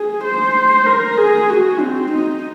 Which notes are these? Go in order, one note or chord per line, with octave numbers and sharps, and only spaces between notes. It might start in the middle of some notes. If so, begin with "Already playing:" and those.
Already playing: G#4
C5
A#4
G#4
F#4
C4
D#4